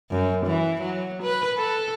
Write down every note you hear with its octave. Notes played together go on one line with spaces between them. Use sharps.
F#2
E3
F#3
B4
A4